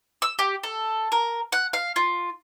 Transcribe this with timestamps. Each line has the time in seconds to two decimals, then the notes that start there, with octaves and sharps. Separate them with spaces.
0.22 E6
0.39 G4
0.63 A4
1.12 A#4
1.52 F#5
1.73 F5
1.96 F4